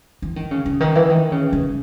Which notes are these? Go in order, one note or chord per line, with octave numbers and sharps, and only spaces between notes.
E3
D#3
C#3
C#3
D#3
E3
D#3
C#3
C#3